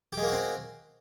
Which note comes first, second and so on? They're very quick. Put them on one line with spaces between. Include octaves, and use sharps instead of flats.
G4 G#3 A#3 F#4 C4